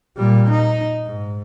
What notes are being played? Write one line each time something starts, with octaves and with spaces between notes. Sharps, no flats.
A#2 G3
D#4
G#2